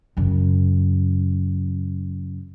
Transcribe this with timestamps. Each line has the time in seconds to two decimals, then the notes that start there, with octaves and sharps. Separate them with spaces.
0.17 F#2 C#3